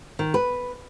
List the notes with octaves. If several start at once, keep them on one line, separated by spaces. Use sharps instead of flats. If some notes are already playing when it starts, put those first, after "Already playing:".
D#3
B4